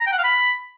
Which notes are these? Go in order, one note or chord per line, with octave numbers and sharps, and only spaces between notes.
A#5
G5
F#5
F5
B5